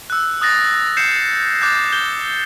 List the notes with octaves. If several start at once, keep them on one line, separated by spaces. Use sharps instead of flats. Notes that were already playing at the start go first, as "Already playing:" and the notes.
E6 F#6
D#6 F#6 A6 A#6
G6 C7 C#7 E7
D6 F#6 G6 A6
G6 G7